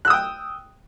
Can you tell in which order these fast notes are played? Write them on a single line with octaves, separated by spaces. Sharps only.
F#6 E6 D#6 G5